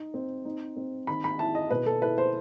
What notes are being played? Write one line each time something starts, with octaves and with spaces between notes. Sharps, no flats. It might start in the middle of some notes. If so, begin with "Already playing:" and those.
Already playing: D#4
C4
D#4
C4
D#3 B5
B5
E4 A5
D#5
B2 B4
A4
E4 B4
C5